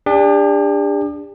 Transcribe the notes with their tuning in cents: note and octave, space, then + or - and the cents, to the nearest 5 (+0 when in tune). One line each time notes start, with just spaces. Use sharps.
D4 +0 G4 +45